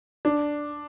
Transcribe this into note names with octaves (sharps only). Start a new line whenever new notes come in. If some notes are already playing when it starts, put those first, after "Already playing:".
D4